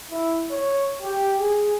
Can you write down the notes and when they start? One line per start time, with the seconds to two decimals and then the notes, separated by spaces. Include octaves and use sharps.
0.11 E4
0.50 C#5
1.01 G4
1.38 G#4